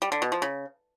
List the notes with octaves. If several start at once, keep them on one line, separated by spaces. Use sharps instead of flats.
G3
D3
B2
F3
C#3